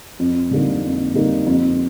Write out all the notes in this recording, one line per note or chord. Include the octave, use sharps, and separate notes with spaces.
F2
D3 G3 A#3 D#4
F2
D3 G3 A#3 D#4
F2